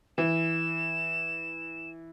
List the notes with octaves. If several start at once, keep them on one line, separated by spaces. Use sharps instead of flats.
E3 E7